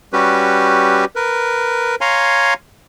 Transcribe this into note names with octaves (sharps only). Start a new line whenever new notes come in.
G3 C#4 F#4 G4 B4
A#4 B4
C#5 F5 G#5 A#5 C6